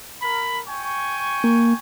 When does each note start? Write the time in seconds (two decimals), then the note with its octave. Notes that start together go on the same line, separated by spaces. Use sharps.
0.22 A#4 B5
0.67 G5 G#5 C#6
1.44 A#3